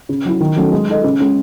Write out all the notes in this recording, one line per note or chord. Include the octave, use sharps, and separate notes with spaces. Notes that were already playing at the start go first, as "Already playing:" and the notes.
C#3
F#3 C#4 E4
D#3
F#3 A3 C#4
G#3
D#4 A4 D#5
C#3
G#3 C#4